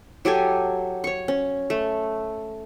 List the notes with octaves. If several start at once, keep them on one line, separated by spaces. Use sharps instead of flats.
F#3 G4 A4 G#5
C#5 C#6
C#4
A3